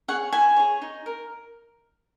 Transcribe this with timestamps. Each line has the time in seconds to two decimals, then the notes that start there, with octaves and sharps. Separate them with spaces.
0.08 G#4 C#5 F#5
0.33 E4 G#5
0.57 G#4 C#5
0.82 D#4
1.06 A#4